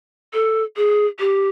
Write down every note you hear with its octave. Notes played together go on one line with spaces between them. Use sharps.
A4
G#4
G4